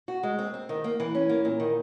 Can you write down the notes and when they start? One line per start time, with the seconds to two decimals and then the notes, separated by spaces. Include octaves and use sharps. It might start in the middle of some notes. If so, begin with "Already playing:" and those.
0.08 F#4
0.23 G#3
0.39 C4
0.54 C4
0.69 D#3
0.84 A#3
1.00 E3
1.15 C#4
1.29 A#3
1.45 A#2
1.60 D#3